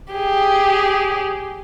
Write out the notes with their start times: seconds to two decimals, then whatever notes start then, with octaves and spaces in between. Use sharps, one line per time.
0.13 G4 G#4